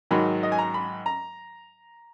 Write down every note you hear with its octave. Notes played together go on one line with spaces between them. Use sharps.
G#2 D#3 F#3 B5
D#5
G#5
A#5
B5
A#5